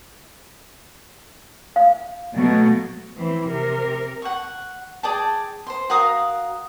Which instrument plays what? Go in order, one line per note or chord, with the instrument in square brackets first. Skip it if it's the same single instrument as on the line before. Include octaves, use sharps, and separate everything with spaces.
[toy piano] F5
[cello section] B2 F#3 A3
[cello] E3 C4
C3 A#4
[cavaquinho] F#5 C#6
G#4 D5 G5 A5
C5 C6
F#4 A#4 F5 D#6